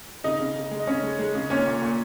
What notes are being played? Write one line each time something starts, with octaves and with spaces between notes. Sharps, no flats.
C#3 D#4 D#5
C#3
C#3
G#3
D#5
C#3 C#4 C#5
G#3
G#3
C#3
A#2 C#4 C#5
A#2
A#2